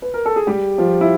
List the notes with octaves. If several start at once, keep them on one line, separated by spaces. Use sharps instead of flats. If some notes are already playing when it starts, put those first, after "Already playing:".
B4
A#4
A4
G#4
G3 G4
F3 F4
E4